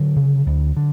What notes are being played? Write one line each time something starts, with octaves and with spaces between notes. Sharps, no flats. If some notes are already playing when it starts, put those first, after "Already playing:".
Already playing: D3 F#3
C#3
D2
D3